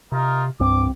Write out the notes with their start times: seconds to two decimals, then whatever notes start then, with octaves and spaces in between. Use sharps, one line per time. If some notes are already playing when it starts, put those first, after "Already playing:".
0.12 C3 D#4 F4 A#4
0.60 C2 G2 C4 D6